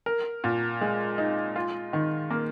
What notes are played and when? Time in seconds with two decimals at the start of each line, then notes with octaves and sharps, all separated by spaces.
0.06 A#4
0.44 A#2
0.81 G#3
1.18 D#4
1.56 F4
1.93 D#3
2.31 A#3